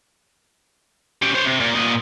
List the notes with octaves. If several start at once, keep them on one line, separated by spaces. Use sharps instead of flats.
C#4 G4
C5 C#5
C3
A#2
A#2 D#5